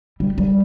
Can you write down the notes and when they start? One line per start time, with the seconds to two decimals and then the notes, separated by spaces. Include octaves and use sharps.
0.20 G3
0.38 G3